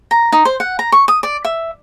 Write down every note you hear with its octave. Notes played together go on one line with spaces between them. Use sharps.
A#5
D#4
C5
F#5
A#5
C#6
D#6
D5
E5